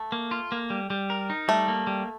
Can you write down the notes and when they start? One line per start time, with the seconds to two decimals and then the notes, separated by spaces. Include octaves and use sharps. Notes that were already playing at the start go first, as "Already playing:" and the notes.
Already playing: A3
0.12 A#3
0.31 F4
0.52 A#3
0.70 G3
0.90 G3
1.10 A#4
1.30 D#4
1.48 G3 A3
1.68 A#3
1.87 G3